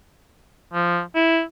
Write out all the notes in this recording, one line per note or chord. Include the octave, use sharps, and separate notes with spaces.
F3
E4